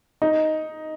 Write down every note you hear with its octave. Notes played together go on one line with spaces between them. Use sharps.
D#4